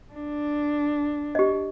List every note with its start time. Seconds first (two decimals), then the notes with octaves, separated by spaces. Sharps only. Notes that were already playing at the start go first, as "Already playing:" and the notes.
0.14 D4
1.35 G4 D#5